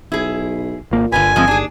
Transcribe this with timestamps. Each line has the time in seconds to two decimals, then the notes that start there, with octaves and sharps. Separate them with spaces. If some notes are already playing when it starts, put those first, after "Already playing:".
0.12 B1 E4 G#4
0.91 G#1 A#2 A#3
1.12 G1 D3 F4 B4 G#5
1.36 F3 G#3 C4
1.48 D#2 D4 G#4